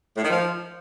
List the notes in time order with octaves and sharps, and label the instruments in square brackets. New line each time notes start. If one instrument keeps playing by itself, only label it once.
[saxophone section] A2
D#3
F3